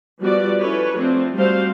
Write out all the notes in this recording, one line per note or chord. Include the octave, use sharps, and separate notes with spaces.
F3 G3 B3 F#4 D5
C#4 E4 A4 B4 C#5
F3 A3 C4 D4
G3 A3 C4 F#4 C5 F5